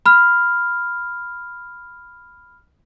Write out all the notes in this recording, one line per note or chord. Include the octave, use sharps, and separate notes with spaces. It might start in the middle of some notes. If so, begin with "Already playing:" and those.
B5 F6